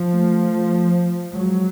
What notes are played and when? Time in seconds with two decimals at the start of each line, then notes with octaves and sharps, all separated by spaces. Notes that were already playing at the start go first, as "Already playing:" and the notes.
Already playing: F3
0.13 A3
1.33 F#3 G#3